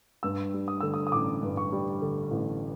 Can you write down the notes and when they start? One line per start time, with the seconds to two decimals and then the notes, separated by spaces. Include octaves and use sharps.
0.23 G2 E6
0.54 G3
0.68 D#6
0.80 D3 E6
0.94 D#6
1.07 D#6
1.12 A1 D6
1.43 G2
1.57 C#6
1.72 G3
2.02 D3
2.31 A1